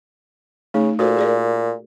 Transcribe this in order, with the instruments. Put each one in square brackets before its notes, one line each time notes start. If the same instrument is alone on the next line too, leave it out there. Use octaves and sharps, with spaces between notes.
[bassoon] C#3 [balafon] A3 D#4
[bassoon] A#2 [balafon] F#4 A4 C5
[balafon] G#4 A#4 D5